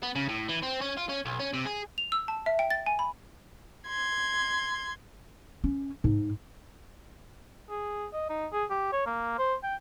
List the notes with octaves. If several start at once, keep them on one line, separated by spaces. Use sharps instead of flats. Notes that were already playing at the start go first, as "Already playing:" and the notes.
B3
C#3
A2
E3
C4
C#4
F4
C#4
B1
C#4
C3
G#4
F7
E6
A5
E5
G5
A6
G#5
B5
C6 G#6
C#4
G#2
G#4
D#5
D#4
G#4
G4
C#5
A#3
C5
G5